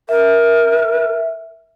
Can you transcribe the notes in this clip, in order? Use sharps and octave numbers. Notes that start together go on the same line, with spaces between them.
A#4 E5